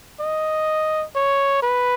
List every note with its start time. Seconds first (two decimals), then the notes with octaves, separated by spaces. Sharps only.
0.20 D#5
1.15 C#5
1.63 B4